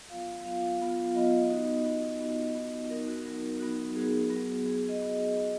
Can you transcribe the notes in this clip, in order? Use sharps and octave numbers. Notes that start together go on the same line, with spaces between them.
F#3 B3 F4 F5
F#3 B3 F4 F5
F#3 B3 F4
F#3 B3 F4 D#5
B3 D#4 F#4
B3 D#4 F#4
B3 D#4 F#4
B3 D#4 F#4
F#3 B3 D#4 F#4 A#4
F#4
F#3 B3 D#4 F#4 A#4
F#3 B3 D#4 F#4
F#3 B3 D#4 F#4 G#4
F#3 B3 F#4
F#3 B3 F#4 G#4
G#4
D#5
F#3 B3 F#4
F#3 B3 F#4